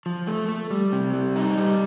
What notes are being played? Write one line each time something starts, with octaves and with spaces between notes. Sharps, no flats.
F3
A3
A3
G3
C3
G3
D#4
G3